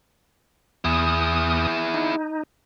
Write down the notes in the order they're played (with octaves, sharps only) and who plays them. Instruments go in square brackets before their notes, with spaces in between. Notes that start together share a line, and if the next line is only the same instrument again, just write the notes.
[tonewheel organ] E2 D#6 [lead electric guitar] E4 G#4
[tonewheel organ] D#4